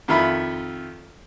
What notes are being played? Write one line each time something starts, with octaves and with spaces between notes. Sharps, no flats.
F2 D#3 F4 E5 B5